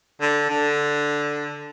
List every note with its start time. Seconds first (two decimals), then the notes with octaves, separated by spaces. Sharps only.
0.21 D3
0.50 D3